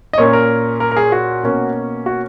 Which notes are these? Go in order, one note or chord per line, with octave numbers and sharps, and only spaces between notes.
D#5
A#2 A#3 C#4 C#5
A#4
A#4
A#4
G#4
F#4
B2 A#3 C#4
F#4